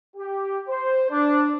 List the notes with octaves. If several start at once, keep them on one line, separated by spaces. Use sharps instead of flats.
G4
C5
D4